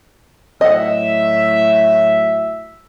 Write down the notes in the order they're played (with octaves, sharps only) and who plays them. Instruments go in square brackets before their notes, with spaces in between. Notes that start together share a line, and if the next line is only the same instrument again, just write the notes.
[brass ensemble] A2 F#3 E5 [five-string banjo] D#5 F#5